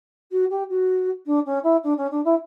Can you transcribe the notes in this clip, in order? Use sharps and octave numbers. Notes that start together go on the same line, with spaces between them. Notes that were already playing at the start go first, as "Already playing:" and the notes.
F#4
G4
F#4
D4
C#4
E4
D4
C#4
D4
E4